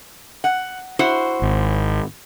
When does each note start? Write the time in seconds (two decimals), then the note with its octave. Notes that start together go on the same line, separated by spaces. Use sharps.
0.44 F#5
0.99 E4 F#4 C5
1.42 G#1